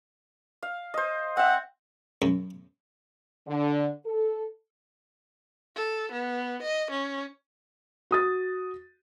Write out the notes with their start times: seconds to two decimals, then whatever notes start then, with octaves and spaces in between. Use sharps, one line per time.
0.63 F5
0.94 C5 D#5
1.37 C4 E5 F#5
2.22 F#2
3.47 D3
4.06 A4
5.76 A4
6.12 B3
6.62 D#5
6.91 C#4
8.11 F#4 D#6 A6